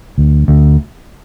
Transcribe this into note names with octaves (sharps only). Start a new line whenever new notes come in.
D2
D2